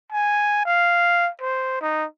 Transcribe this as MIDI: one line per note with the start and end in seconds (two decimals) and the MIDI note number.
0.12 0.61 80
0.65 1.30 77
1.41 1.77 72
1.82 2.05 63